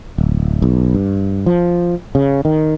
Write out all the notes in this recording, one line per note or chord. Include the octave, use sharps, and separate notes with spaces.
D1
B1
G2
F3
C#3
D#3